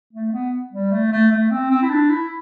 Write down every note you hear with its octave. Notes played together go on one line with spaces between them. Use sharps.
A3
B3
G3
A3
A3
A3
C4
C4
E4
D4
E4